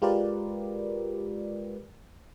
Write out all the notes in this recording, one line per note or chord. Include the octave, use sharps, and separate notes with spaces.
G#3 F4 G4 A#4 B4 D5